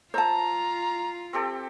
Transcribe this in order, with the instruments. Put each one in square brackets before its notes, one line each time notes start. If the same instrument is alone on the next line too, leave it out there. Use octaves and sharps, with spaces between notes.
[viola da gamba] F4 [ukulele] C5 A5 [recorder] A#5 [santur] E6
[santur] C4 G4 A4